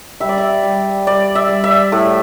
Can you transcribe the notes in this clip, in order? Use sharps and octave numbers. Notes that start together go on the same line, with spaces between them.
G3 E5
D5
E5
G3
G3 D5
E5
G3
E5
A2